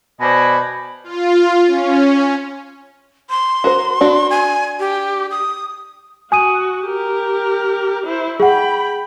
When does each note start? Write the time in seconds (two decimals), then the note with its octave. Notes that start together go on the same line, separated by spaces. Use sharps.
0.21 B2 C5 D5 D#5 G#5 B5
1.04 F4
1.67 C#4
3.30 C6
3.64 F#4 A#4 C5
4.01 D4 F#4
4.30 G#5
4.80 G4
5.31 D#6
6.32 F#4 G#5 D#6 D#7
6.86 G4 A#4
8.06 E4 C5
8.40 G#4 F#5 G5 B5